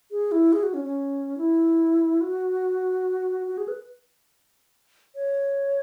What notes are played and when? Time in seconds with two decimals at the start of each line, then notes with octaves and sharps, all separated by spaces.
0.11 G#4
0.32 E4
0.53 G#4
0.63 F#4
0.74 C#4
0.84 C#4
1.38 E4
2.21 F#4
3.47 F#4
3.58 G#4
3.68 B4
5.15 C#5